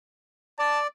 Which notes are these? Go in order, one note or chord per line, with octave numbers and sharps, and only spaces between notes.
D5 A5